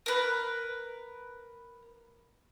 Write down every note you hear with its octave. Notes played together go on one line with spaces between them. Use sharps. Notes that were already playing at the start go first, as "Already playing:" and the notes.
A#4 B4